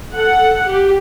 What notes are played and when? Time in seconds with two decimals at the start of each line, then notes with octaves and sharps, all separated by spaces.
0.15 A4 F#5
0.68 G4